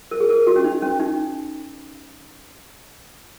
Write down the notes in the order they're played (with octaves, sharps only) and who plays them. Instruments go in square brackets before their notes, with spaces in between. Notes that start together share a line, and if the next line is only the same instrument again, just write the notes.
[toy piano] A#4
G#4
A#4
F#4
C#4
D#4
C#4
D#4